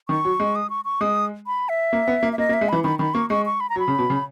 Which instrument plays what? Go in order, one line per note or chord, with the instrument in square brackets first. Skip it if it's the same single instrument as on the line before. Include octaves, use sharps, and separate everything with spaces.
[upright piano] D#3 [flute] C#6
[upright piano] F#3
G#3
[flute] D#6
C#6
C#6
[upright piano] G#3 [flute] D#6
[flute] B5
E5
[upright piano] A#3
B3
A#3
[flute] E5
[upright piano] A#3 [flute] D#5
[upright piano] A#3
[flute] E5
[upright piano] G#3
[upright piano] E3 [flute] B5
[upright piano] D#3 [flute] B5
[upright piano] D#3 [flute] B5
[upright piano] A#3 [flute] C#6
[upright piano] G#3 [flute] C#6
[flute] C#6
B5
A#5
[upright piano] F#3
[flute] B5
[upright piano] C#3
B2
C#3